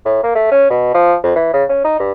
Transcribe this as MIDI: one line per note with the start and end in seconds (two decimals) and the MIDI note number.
0.05 0.22 45
0.23 0.34 58
0.35 0.49 57
0.51 0.68 61
0.70 0.91 47
0.94 1.15 53
1.23 1.33 41
1.36 1.52 52
1.53 1.64 49
1.69 1.81 61
1.84 1.97 63
1.99 2.12 43